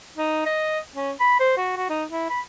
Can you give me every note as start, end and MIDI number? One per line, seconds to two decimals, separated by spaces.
0.18 0.44 63
0.46 0.79 75
0.96 1.11 61
1.20 1.37 83
1.40 1.54 72
1.57 1.72 66
1.77 1.86 66
1.90 2.04 63
2.10 2.26 64
2.30 2.40 83